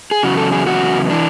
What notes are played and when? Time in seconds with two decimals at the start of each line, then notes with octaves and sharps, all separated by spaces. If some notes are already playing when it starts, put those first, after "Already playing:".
0.11 G#4
0.23 E2 C#3 F#3 F#4
0.37 A4
0.52 G#4
0.67 E2 C#3 F#3 F#4
1.10 E3 D4